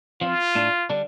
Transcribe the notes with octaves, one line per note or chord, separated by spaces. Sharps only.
F3 C4 F4
A2 A3 D4
D3 G3 D4